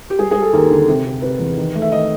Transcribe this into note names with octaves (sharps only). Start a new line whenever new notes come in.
G4
G3 G#4
G#4
G3
A4
D#2 A#4
D3
C3
C3
C3 B4
E2
D#3
A3
E5
D#3 D#5